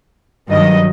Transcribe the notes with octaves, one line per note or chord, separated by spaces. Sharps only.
G2 D#3 F#3 D#5